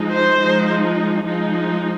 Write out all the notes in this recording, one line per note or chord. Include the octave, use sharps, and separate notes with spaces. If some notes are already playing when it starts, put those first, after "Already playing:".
Already playing: F3 G#3 D#4
C5
F3 G#3 D#4
F3 G#3 D#4